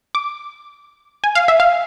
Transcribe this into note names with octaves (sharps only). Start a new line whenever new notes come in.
D6
G#5
F5
E5
F5